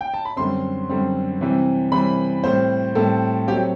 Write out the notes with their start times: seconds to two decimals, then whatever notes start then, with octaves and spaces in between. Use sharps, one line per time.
0.01 G5
0.14 A5
0.25 B5
0.36 F#2 D3 G3 C4 C6
0.89 F#2 D3 G3 C4
1.41 C3 E3 G3 C4
1.92 C3 E3 G3 C4 B5
2.44 A2 G3 C4 C5
2.95 A2 G3 C4 A4
3.48 F#3 A3 C4 G4